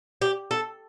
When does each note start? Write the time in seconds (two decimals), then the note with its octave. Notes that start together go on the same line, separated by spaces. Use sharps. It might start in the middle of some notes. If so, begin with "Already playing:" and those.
0.22 G4
0.51 A4